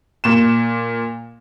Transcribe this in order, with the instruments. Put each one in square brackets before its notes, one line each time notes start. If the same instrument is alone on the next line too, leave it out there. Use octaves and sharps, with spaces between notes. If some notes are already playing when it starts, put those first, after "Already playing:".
[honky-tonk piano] A#2 E7